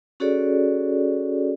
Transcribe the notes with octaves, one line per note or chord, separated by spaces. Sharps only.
C#4 F#4 G#4 A4 C#5 D5